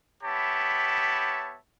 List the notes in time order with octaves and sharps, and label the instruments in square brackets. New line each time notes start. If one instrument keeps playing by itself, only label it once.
[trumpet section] B3 G4 C#5 E5 A5 B5